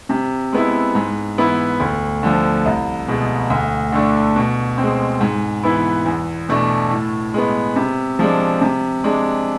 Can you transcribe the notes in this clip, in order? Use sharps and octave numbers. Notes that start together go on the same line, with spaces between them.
C3
G#3 B3 E4
G#2
E3 B3 E4
D2
D3 F3
C2
B2 G#3
D2
D3 A3 D4
B2
G#3 C4
G#2
E3 B3 E4
E2
B2 A3 D4
A2
G#3 B3
C3
F3 G#3 D4
C3
G#3 D4